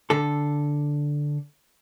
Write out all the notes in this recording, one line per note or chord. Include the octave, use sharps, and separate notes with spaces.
D3 A4